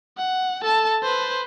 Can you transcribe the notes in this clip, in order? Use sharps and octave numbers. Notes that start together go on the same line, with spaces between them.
F#5
A4 A5
B4 C5